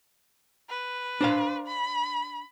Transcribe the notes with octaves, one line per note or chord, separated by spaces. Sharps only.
B4
D4 C5 F5
B5